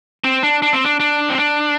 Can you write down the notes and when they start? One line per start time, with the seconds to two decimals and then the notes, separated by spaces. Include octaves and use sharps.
0.24 C4
0.43 D4
0.62 D4
0.73 C4
0.84 D4
1.00 D4
1.30 C4
1.38 D4